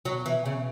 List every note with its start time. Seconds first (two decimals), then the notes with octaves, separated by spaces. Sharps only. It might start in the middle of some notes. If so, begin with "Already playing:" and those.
0.05 B2 F#3
0.26 E3
0.46 C#3